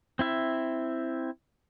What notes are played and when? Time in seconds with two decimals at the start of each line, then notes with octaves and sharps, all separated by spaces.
0.19 C4 E4 E5